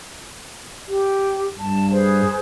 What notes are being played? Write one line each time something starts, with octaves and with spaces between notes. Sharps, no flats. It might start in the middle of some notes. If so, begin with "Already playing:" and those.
G4
G2 A5
G#4 B4 C5